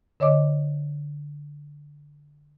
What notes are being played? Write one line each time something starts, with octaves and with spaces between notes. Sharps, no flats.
D3 C#5 D#5 D6